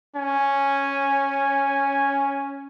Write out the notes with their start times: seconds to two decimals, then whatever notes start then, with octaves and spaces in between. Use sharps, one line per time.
0.16 C#4 G#5